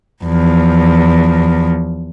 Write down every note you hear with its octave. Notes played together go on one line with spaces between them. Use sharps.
E2 F3